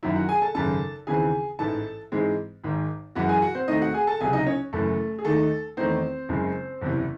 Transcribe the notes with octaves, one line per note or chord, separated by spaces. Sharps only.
F#2 D#3 F#3 E4 E5
F#4 F#5
G#4 G#5
A4 A5
G#1 F#2 C#3 A4 A5
D#2 C#3 E3 C4 G#4 G#5
A1 G#2 E3 A4 A5
G#2 E3 G#3 C4
G#1 G#2 D#3
F#2 E3 G#3 F#4 F#5
G#4 G#5
F#4 F#5
C4 C5
D#2 D#3 A3 C4 D#4 D#5
F#4 F#5
G#4 G#5
A4 A5
C#2 C3 F#3 G#4 G#5
D#4 D#5
C#4 C#5
F#1 F#2 E3 A3 A4
G#4
D#2 D#3 A3 D#4 A4
E2 D#3 A3 C4 D#4 C5
F#1 F#2 C#3 G#3
F#1 E2 C3 E3